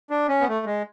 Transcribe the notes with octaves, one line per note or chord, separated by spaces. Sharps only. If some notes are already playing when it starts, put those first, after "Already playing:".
D4
C#4
B3
A3
G#3